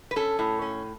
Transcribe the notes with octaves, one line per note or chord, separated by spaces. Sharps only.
B4
C#4 A4
A2
C#4